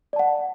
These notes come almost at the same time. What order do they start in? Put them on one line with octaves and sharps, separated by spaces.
D5 A5 F#5